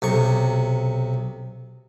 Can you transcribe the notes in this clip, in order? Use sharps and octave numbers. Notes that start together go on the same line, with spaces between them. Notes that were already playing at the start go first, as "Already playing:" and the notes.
B1 C3 C#6